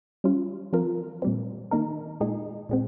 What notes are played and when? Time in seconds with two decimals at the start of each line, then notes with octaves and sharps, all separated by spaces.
0.24 G3 C#4 F4
0.73 F3 C4 F4 A#4
1.22 A#2 G3 C4
1.71 D#3 A#3 D#4 A#4
2.20 A#2 G#3 D#4 G#4
2.69 A#2 G#3 C4